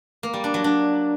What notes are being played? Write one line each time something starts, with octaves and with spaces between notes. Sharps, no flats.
A#3
G3
D4
F#3
D4